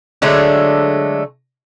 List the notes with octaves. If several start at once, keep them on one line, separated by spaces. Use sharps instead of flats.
D3 F#3 G#3 A3